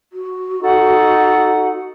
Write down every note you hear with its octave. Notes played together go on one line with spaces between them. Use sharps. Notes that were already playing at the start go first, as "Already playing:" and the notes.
F#4
D#4 A4 F#5